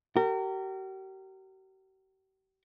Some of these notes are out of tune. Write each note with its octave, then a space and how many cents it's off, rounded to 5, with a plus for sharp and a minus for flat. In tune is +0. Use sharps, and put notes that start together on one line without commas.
G4 -45 A#4 -30